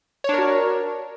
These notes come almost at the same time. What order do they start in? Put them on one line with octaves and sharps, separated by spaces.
C#5 D4 A#4 F#4